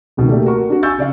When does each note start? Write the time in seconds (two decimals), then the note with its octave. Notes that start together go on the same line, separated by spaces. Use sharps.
0.17 C#2 B2 D#3
0.29 A3 A#3 G4 A4 D5
0.46 F#4 A#4 C#6
0.70 D4 F#4
0.83 G#5 C#6 E6 G6 A6
0.98 C#3 D5 F5